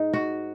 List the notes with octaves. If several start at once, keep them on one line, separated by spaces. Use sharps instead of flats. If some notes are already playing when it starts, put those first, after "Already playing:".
Already playing: G#2 D#4
F#4